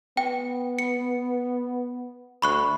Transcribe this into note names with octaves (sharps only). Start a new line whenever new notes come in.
B3 G5
C#7
D2 B5 C#6 F#6